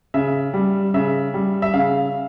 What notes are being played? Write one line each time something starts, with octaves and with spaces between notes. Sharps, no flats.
C#3 E5
G3
C#3 E5
G3
E5
C#3 F5